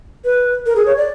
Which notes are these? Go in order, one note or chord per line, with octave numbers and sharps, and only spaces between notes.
B4
A#4
G#4
C#5
D5